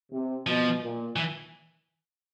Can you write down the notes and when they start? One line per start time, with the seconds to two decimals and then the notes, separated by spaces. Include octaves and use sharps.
0.12 C3
0.46 B2 F3
0.82 A#2
1.16 E3